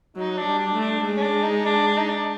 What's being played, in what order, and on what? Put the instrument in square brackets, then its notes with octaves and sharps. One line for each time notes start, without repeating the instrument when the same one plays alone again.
[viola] F#3 [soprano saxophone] D#4
[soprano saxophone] D4
[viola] G3
[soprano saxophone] D4
[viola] A3
[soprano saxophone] D4
[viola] G#3
[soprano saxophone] C#4
D4
D#4
D4
D4
D#4
D4